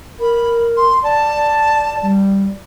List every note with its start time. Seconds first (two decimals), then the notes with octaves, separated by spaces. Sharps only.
0.20 A#4 B5
0.77 C6
1.03 D5 A5
2.02 G3